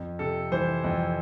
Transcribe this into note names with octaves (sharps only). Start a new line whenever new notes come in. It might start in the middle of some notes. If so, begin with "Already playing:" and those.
Already playing: F2
C3 A4
E3 C5
F2